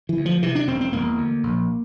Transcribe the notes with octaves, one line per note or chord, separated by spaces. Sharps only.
E3
D2
F3
C3 E3
D4
E1 C4
C4
E1 A#3
D2
A#1